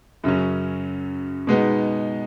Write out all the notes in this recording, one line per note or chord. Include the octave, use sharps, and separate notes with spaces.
F#2 C#3 F#3 C#4
B2 G#3 B3 D#4